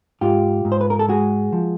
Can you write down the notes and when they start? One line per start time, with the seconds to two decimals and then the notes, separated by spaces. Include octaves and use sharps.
0.21 G#2 F4 G4
0.65 G#2
0.72 C5
0.81 B4
0.90 A#4
0.99 A4
1.08 G#3 F#4 G#4
1.52 F3